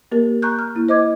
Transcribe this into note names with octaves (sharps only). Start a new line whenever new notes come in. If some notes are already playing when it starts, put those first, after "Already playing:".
A#3 G4 A#4
A#5 C#6 F#6 G6
F6
A#3 E4
C5 D#5 D6 G#6